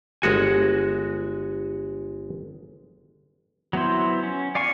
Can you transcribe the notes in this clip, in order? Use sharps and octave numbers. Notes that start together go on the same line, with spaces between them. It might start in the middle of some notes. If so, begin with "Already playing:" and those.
G1 G#3 F#4 G#5
F#3 B3 E4 C5
C#4
D5 F5 G#5 C#6